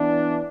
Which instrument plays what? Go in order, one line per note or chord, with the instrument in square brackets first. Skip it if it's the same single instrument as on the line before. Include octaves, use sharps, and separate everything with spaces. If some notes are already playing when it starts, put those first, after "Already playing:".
Already playing: [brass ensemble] E3 B3 D4